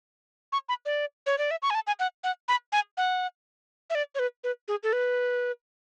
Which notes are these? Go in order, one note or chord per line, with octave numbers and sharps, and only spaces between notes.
C#6
B5
D5
C#5
D5
E5
C#6
G#5
A5
G#5
F#5
F#5
B5
G#5
F#5
E5
D5
C#5
B4
B4
G#4
A4
B4